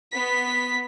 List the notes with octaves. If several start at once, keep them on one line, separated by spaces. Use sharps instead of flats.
B3 B6